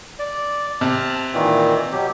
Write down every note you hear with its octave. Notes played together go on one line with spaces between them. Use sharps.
D5
C3 A5 F6 F#6
A#2 D#3 E3
B2 F#3 G4